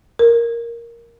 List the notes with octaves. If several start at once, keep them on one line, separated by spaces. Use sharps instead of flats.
A#4